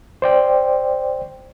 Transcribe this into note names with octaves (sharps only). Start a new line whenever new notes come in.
C5 D5 G5